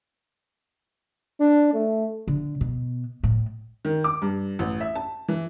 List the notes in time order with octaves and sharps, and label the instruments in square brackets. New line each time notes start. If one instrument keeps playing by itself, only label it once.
[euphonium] D4
A3
[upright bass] D3
B2
A2
[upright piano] D#3
D6
G2
A1
E5
A5
E3